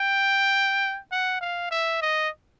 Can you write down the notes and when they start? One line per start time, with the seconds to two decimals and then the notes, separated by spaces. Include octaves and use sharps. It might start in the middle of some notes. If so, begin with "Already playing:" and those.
Already playing: G5
1.11 F#5
1.41 F5
1.71 E5
2.02 D#5